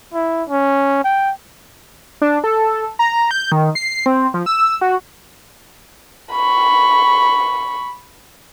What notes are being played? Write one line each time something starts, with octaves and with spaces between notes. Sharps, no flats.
E4
C#4
G5
D4
A4
A#5
G6
D#3
C7
C4
F3
E6
F#4
B5 C#6